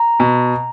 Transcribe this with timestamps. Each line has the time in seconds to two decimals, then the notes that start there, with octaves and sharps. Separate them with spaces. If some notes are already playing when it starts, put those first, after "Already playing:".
Already playing: A#5
0.20 B2